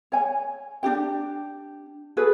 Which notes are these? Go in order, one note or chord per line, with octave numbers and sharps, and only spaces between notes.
C#5 G#5
D4 F#4 G4 G5
F#4 G#4 A4 B4